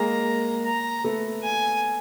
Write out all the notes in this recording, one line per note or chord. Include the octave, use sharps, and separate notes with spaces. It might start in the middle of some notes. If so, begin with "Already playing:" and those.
Already playing: G#3 A#3 A#5
A#5
A3 B3
G#5